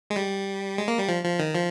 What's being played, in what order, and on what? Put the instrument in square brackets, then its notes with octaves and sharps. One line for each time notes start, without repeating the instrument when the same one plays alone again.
[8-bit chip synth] G#3
G3
G#3
A#3
G3
F3
F3
D#3
F3